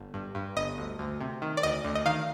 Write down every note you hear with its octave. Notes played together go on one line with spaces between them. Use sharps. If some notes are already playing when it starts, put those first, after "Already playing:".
Already playing: G1
G2
G2
G1 D#5
D2
D2
C3
D#3
D5
D2 D#5
D2
D#5
D#3 F5